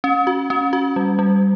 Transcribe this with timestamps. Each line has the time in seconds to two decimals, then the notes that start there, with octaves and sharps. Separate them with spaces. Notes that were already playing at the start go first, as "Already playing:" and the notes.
0.04 C#4
0.27 F#4
0.50 C#4
0.73 F#4
0.96 G3
1.19 G3